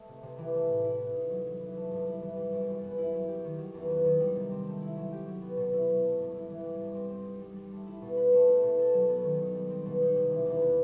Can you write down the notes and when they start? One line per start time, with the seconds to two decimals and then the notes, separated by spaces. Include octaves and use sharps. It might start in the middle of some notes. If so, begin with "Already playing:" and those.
Already playing: A3 D#5
0.08 C3
0.23 C3
0.38 E3
0.54 A3
0.69 A2
0.84 E4
0.99 B3
1.15 D#4
1.30 F#3
1.46 F#3
1.61 E3
1.76 A3
1.91 G2
2.06 E4
2.22 E3
2.37 G3
2.52 F#2
2.68 F#2
2.83 B3
2.98 E4
3.13 F#3
3.29 G4
3.44 D#3
3.59 F#3
3.74 E2
3.90 B3
4.05 D#3
4.20 G3
4.36 C3
4.51 C4
4.67 A3
4.82 E4
4.97 F#3
5.12 G4
5.27 F#3
5.42 B3
5.57 B2
5.73 E4
5.88 F#3
6.03 A3
6.19 G2
6.34 E4
6.50 E3
6.65 G3
6.80 G2
6.95 C4
7.10 C4
7.26 D#4
7.41 G3
7.56 G3
7.72 A3
7.86 E4
8.02 B2
8.17 B4
8.33 A3
8.48 E4
8.63 B2
8.79 A4
8.94 F#3
9.09 B3
9.24 D#3
9.39 D#4
9.55 G3
9.70 C4
9.86 B2
10.01 D#4
10.16 C3
10.31 E3
10.46 E2
10.62 B3